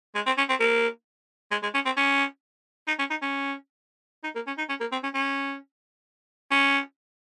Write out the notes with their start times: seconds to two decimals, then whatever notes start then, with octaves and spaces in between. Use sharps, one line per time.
0.15 G#3
0.26 C4
0.37 C#4
0.49 C4
0.60 A#3
1.51 G#3
1.63 G#3
1.74 C#4
1.85 C4
1.97 C#4
2.88 D#4
2.99 C#4
3.10 D#4
3.22 C#4
4.24 D#4
4.35 A#3
4.47 C#4
4.58 D#4
4.69 C#4
4.80 A#3
4.92 C4
5.03 C#4
5.14 C#4
6.51 C#4